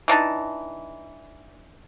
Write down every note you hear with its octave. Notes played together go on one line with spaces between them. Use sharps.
E3 D4 D#4 A5